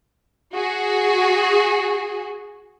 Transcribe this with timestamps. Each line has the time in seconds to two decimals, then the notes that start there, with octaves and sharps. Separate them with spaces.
0.54 F#4 G#4